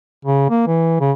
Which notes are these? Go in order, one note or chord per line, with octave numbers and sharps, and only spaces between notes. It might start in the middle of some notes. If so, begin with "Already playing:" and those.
C#3
A#3
E3
C#3